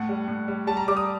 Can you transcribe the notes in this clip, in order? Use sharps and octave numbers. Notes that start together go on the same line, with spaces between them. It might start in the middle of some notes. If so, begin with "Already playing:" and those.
Already playing: A2 F#5
G3
A2
G3
G3 A5
A#5
G3 D6
D#6